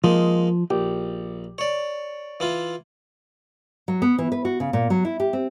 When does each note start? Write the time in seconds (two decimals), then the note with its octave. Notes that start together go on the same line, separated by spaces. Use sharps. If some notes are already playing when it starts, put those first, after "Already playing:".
0.04 F3 G#3 A#3 D#4
0.70 A#1 G4
1.58 C#5 D5
2.40 E3 E4 F4
3.88 F#3
4.02 B3
4.18 E3
4.32 B4
4.45 F#4
4.60 C#3
4.73 A#2
4.90 F#3
5.05 E4
5.20 G4
5.33 C4